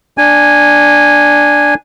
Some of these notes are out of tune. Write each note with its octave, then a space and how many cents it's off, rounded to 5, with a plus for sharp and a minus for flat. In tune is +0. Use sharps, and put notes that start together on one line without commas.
D4 +0 G#5 -10